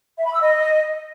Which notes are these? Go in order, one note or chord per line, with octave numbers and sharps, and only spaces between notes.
E5
B5
E6
D#5